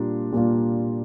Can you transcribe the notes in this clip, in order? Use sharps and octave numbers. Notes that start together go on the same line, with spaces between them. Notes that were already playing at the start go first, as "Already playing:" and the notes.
Already playing: A#2 G3 A#3 D4 F4
A#2 G3 A#3 D4 F4